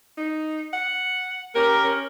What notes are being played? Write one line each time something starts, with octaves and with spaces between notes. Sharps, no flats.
D#4
F#5
C#4 G4 A#4
C#4